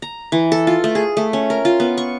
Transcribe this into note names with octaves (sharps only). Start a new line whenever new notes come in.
A#5
E3
A4
F4
A3
G#4
A3
C#4
A#4
F4
B3
C#6